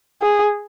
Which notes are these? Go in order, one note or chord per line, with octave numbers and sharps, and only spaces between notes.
G#4